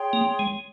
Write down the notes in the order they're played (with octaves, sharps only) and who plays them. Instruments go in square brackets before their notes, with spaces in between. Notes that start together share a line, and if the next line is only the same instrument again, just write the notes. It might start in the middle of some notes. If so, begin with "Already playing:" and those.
Already playing: [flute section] G#4 C#5 G5 C6
[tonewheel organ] A#3
G#3